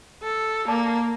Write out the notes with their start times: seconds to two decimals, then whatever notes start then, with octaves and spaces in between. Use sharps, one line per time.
0.23 A4
0.68 A#3 D5 A5 D6